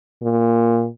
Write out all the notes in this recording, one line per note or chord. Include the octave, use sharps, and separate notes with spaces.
A#2